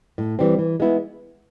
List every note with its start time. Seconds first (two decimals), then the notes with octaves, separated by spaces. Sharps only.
0.18 A2
0.39 E3 G3 C4
0.59 E3
0.80 G#3 B3 E4